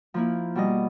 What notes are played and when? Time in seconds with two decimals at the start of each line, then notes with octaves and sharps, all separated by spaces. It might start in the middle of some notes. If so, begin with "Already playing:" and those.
0.14 F3 A#3 E4
0.55 B2 G3 D#5